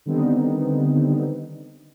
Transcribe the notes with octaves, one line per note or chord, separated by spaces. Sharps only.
D3 D#3 G3 B3 C4 D#4